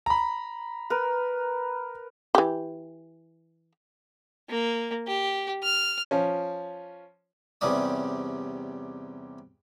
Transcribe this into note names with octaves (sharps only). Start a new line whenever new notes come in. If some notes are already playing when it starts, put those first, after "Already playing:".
A#5 B5
A#4 B4
E3 G4
A#3
G4
F6
F3 C#4
E2 C3 G3 C#4 D5 D#6